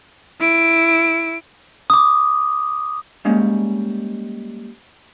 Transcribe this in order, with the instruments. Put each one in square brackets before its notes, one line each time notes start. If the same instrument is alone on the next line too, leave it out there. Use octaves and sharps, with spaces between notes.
[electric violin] E4 D7
[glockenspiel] D6 D#6
[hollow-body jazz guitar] G3 G#3 A#3 C#4